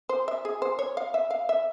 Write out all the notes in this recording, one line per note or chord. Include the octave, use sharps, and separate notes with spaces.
C5
E5
G#4
C5
C#5
F5
E5
F5
E5